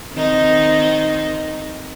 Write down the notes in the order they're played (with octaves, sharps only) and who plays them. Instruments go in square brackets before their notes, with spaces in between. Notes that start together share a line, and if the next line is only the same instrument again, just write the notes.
[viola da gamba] D#3 C4 D#4